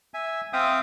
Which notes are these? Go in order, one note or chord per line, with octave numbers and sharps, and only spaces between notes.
E5 G#5
C4 E5 F5 G5 D#6